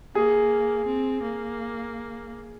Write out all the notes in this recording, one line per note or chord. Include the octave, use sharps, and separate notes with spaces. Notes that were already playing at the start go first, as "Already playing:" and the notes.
A#3 G#4
C4
A#3